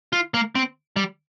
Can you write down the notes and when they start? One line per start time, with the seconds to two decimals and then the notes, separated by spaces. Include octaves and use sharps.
0.13 F4
0.34 A#3
0.55 C4
0.96 G3